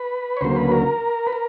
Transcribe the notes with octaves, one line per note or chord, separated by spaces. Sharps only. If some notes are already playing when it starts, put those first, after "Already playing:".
Already playing: B4
C#5
D2 C#3 F#3 A#3 C5
B4
A#4
B4
A#4